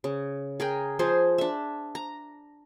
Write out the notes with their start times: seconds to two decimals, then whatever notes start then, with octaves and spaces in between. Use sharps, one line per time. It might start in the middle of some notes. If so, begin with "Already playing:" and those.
0.04 C#3
0.60 G#4 A#4 G5
0.99 F3 F4 G#4 C5
1.38 D4 E5
1.95 A#5